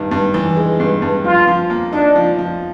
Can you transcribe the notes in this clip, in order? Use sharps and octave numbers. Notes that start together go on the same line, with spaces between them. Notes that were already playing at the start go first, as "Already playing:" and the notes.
Already playing: G2 D#3
G2
E3
G#3
G2
G2
F3 F4
F3
A#3
D4 D#4
F3
F3